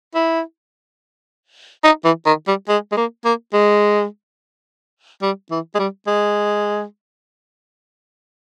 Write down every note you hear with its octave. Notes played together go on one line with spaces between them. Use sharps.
E4
D#4
E3
D#3
G3
G#3
G#3
A#3
A#3
G#3
G3
E3
G#3
G3
G#3